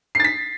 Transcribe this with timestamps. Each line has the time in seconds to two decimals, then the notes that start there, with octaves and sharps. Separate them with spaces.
0.15 C7
0.20 A6
0.24 B6